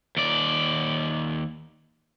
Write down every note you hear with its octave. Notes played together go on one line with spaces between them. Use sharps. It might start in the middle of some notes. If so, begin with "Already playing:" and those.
D#2 D5